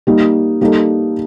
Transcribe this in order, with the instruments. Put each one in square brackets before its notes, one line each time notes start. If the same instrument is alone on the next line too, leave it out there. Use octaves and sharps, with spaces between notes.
[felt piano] G3 A#3 D#4
G3 A#3 D#4 A4